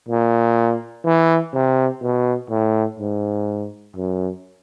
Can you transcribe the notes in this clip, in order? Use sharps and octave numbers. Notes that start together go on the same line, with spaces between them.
A#2
E3
C3
B2
A2
G#2
F#2